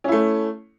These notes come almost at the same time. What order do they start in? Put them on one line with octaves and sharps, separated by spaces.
C#4 E4 A3